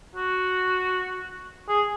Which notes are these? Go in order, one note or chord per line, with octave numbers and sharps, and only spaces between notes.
F#4
G#4